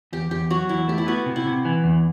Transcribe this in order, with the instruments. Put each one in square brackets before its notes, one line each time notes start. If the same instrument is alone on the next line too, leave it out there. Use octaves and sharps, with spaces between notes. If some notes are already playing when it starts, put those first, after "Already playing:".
[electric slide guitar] E2 [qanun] G4
[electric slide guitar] E2 [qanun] G4
[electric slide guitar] F#3 [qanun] F#4
[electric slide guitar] E2 [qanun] E4
[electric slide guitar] A3 [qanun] G4
[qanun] E4
[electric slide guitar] B3 [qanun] F#4
[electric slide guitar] C3
[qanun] E4
[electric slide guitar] C3
E3
E2